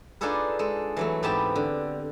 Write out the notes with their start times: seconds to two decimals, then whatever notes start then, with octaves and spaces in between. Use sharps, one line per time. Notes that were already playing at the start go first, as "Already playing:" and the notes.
0.21 D4 D#4 F4 G#4 A4 B4
0.59 G#3 A4
0.97 E3 F#3 A3
1.23 G#2 B3 C4 G4 B4 A5
1.56 D3